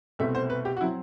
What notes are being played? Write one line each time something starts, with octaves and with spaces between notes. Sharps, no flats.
C2 B2 A3 C4 E5
C5
B4
G4
F#4
F#3 C4 E4